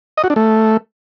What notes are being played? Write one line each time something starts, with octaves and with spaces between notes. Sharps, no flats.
D#5
F#4
D4
A3